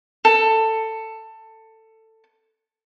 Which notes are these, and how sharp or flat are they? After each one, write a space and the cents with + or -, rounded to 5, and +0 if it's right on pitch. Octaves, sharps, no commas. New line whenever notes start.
A4 +15